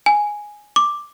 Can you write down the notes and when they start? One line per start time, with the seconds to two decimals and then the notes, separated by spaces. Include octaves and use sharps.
0.06 G#5
0.76 D6